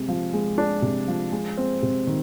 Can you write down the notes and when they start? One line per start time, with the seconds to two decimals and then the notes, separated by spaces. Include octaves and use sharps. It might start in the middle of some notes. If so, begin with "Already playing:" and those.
Already playing: C3 G#3
0.08 F3
0.33 G#3
0.58 D4
0.82 C3
1.08 F3
1.32 G#3
1.58 C4
1.82 C3
2.07 D#3